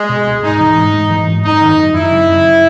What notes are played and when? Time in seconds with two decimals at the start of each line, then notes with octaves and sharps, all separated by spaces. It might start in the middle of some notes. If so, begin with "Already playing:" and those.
Already playing: G#3
0.09 B2
0.26 C#2
0.43 G#2 D#4
0.60 E3
0.77 G#2
0.93 G#2
1.10 E3
1.27 G#2
1.44 F#2 D#4
1.61 D#3
1.78 F#2
1.95 F#2 E4
2.12 C#3
2.29 F#2